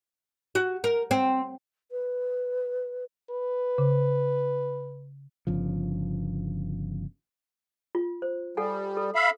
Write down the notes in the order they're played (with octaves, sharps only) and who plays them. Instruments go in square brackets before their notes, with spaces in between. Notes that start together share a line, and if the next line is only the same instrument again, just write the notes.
[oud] F#4
A#4
C4
[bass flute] B4
[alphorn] B4
[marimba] C#3
[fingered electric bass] G1 C#3 F3
[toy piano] F4
C5
[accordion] G3 [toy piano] A4 F#5 G#5
[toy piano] A4
[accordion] E5 F5 B5